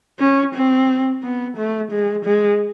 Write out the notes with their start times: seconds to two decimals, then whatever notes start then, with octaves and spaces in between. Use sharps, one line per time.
0.20 C#4
0.54 C4
1.23 B3
1.57 A3
1.92 G#3
2.25 G#3